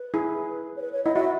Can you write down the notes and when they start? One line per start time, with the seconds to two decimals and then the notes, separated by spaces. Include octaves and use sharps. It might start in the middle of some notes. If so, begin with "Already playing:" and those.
Already playing: B4
0.14 E4 G#4
0.76 C#5
0.81 B4
0.93 C#5
1.04 E4 D#5
1.15 F#4 E5